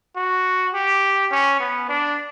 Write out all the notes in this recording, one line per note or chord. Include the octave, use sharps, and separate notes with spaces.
F#4
G4
C#4
B3
D4